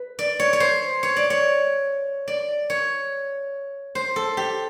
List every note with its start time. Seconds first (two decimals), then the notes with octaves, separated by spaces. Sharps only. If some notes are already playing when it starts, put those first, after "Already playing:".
Already playing: B4
0.19 D5
0.40 C#5
0.53 C#5
0.60 C5
1.03 C#5
1.16 D5
1.30 C#5
2.28 D5
2.70 C#5
3.95 C5
4.16 A4
4.37 G4